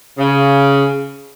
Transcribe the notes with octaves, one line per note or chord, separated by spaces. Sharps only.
C#3